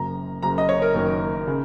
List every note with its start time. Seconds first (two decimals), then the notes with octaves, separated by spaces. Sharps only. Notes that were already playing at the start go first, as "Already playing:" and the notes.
Already playing: F#1 F#2 C#3 A#5
0.42 F#1 F#2 C#3 A#5
0.58 D#5
0.69 C#5
0.82 A#4
0.94 F#1 F#2 D#3
1.47 C#3